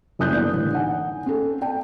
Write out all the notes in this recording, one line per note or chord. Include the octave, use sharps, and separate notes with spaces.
F#1 F#2 E4 D#6 F#6 G6
D3 E3 B3
A1 D4
D#4 F#5 G#5
C4 C#4 A4
G5 A5